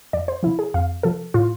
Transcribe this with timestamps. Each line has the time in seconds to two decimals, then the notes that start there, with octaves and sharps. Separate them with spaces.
0.13 F2 D5
0.28 C5
0.43 C3 F3 E4
0.59 G#4
0.74 F2 F5
1.03 C3 F3 A4
1.34 A2 F4